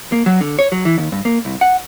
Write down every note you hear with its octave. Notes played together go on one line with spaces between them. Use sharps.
A#3
F#3
D3
C#5
F#3
E3
D#2
G2
A#3
C2
F#5